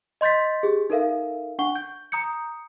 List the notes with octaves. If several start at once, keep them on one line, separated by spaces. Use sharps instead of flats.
D#5 C6 G6 A6 B6
G4 G#4
D#4 A4 A#4 E5 F5
D4 F#5 C#6 G7
G6
A#5 D#6 G6 C#7